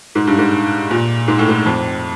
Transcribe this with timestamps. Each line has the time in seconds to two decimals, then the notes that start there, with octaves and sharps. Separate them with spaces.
0.15 G#2
0.27 G2
0.38 G#2
0.91 A#2
1.28 G#2
1.39 A2
1.49 G#2
1.66 F2